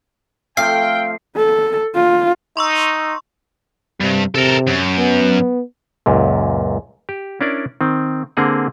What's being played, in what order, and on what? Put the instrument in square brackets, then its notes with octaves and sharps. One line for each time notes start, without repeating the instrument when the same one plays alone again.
[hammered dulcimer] F3 A3 C4 [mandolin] F5 [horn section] G5 [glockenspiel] C7
[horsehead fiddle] A4
F4
[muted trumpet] D#4 [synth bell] C6 C#6 E6
[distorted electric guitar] G2 [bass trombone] C3
[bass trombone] C3 [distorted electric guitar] A4 A#4
[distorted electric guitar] F#2
[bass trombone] B3
[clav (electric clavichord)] C#2 F#2 A#2
G4
C#4 D4 E4 A#4 D5
D#3 C4
D3 A#3 C4 G#4 F#5